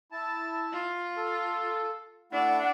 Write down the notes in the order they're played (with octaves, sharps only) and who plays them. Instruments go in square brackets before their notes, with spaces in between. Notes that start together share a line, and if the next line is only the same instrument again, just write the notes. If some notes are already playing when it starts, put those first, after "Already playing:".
[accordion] E4 A5
[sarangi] F4
[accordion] A4
[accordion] A3 E4 [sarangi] D4 [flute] F#5